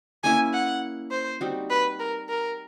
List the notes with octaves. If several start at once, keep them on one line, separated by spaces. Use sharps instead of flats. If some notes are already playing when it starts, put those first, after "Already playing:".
A#3 C#4 E4 G#5
F#5
C5
G3 C4 D#4 F#4
B4
A#4
A#4